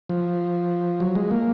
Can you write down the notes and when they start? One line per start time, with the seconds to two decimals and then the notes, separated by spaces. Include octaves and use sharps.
0.09 F3
1.00 F#3
1.15 G#3
1.31 A#3